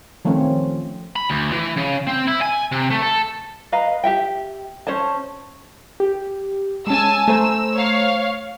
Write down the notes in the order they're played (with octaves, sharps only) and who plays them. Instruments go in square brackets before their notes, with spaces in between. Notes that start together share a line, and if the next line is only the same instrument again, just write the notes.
[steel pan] D#3 F3 A3 C4 C#4 C#5
[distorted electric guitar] B5
D2
E3
C#3
C4
E4
G#5
C3
A3
A4
[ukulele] B4 D#5 F5 A#5
G4 E5 G5
C#4 C5 C#5 A5
[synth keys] G4
[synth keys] G#3 C#4 [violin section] G#5 A5 E6
[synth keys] A3 C5 A#5 [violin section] E6
[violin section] C#5 F5